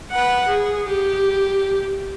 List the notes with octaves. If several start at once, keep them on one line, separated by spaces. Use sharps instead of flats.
B4 F#5
G#4
G4